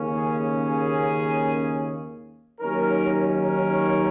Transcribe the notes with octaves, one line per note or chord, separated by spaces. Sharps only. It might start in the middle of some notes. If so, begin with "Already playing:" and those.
Already playing: D#2 C#3 A#3 C#4
G#4
G#4
D#2 D#3 F#3 C#4 A#4
A#4